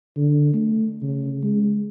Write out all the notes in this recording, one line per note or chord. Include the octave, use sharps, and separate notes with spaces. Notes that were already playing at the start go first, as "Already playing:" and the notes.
D3
A3
C#3
G#3